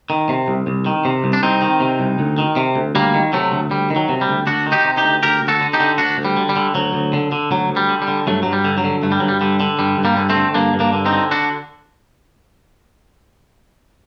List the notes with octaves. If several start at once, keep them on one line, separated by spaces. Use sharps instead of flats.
D#3
C3
C2
C2
D#3
C3
C2
D4
C2 C4 D#4
D#3
C3
C2
D2
D#3
C3
D2
D2 G3 A#3
D#3
C3 F#3 A3
D2
D2 G3
D#3
F#3
C3
G3
D2
D2 D4 F#4
D#3
D#4 G4
C3
D#4 G4
D2
D2 G4 A#4
D2
F#4 A4
D3
D#4 G4
D3
D2 D4 F#4
D2
G3
D3
G3
D3
D2 F#3
D2
D3
D3
D2 F#3
D2
G3
D3
G3
D3
G2 F#3 A3
G2 F#3
G3
D3
F#3
D3
G2 A3
G3
G2 F#3
G3
D3 G3
D3
G2 G3
G2
G3 A#3
D3
A3 C4
D3
G2 A#3 D4
G2
A#3 D4
D3
C4 D#4
D3
D4 F#4